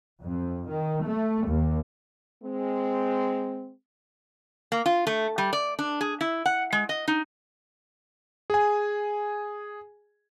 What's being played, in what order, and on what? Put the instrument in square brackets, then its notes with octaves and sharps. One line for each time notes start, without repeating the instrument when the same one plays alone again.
[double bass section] F2
D#3
A3
D#2
[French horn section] G#3 C4
[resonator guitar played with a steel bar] A#3
F4
A3
G3
D5
D4
G#4
E4
F#5
G#3
D#5
D#4
[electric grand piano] G#4 G#5